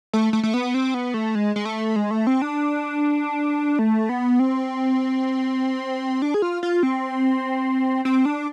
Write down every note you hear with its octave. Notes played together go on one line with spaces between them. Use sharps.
A3
A3
A3
B3
C4
B3
A3
G#3
G#3
A3
G#3
A3
C4
D4
A3
B3
C4
D4
G#4
F4
F4
C4
C4
D4